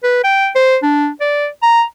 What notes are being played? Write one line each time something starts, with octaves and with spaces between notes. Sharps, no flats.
B4
G5
C5
D4
D5
A#5